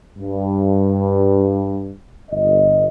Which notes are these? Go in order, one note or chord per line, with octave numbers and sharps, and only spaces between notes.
G2
G1 D#5